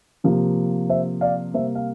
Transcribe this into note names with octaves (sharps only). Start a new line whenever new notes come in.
C3 F3 A#3
C5 E5
D5 F5
C3 G3 A#3 C5 E5
F5